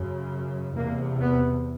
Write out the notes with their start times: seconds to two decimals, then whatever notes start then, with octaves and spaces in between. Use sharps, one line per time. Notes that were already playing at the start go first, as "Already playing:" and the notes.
Already playing: F#2 C#3
0.74 E2 C3 A#3
1.21 B3